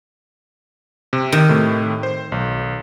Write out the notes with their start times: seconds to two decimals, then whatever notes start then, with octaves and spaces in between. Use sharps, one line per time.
1.13 C3
1.32 D#3
1.49 A2 C3 A3
2.03 C5
2.32 B1